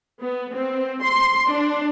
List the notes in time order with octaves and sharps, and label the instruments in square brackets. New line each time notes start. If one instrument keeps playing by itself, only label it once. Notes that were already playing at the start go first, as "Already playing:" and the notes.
[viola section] B3
C4
C6
D4